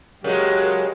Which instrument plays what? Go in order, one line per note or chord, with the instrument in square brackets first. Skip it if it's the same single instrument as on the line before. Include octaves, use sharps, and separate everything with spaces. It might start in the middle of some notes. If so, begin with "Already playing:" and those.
[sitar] C#3 G#3 [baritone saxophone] F#3 [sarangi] G4 [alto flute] A#4